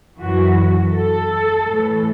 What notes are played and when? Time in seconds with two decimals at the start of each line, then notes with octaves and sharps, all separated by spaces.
0.20 F#2 E3 F#4
0.94 A4
1.67 A2 E3